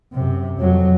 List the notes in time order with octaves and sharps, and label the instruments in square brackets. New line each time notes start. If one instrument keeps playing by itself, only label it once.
[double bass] F#2 C3
F2 F#3